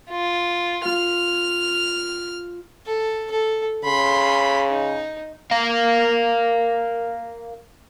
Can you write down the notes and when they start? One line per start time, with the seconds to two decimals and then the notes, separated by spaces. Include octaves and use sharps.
0.11 F4
0.85 F4 F6
2.86 A4
3.31 A4
3.84 C#3 B5 C6
4.70 D#4
5.51 A#4 F5